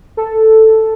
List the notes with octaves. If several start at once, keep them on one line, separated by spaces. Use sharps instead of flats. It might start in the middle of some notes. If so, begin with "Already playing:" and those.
A4